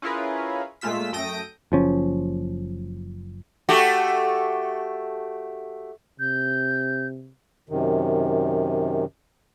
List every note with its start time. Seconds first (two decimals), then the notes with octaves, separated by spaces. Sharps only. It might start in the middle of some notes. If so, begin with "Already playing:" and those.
0.02 C#4 E4 F4 G#4 A#4 B4
0.81 A#2 G#3 A3 F4 E6 B6
1.12 F#2 A3 G5 D#6 A#6 D7
1.72 F#1 F3 C#4
3.69 A3 F#4 G4
6.20 C3 G6
7.69 F#2 C3 D#3